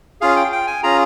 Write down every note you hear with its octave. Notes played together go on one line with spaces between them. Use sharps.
C#4 F4 G#4 F5
G5
G5
G#5
C#4 F4 G#4 A#5